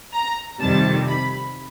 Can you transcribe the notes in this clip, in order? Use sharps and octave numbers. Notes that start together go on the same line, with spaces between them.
A#5
F2 C3 D#3 G3 A5
B5